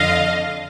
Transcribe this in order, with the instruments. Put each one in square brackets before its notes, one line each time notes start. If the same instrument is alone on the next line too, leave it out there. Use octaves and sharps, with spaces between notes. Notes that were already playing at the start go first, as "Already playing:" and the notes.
Already playing: [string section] F2 D3 D#5 F5